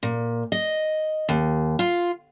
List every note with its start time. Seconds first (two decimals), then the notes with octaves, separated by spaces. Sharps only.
0.03 A#2
0.52 D#5
1.29 D#2
1.79 F4